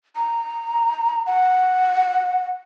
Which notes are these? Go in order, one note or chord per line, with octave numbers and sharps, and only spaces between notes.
A#5
F#5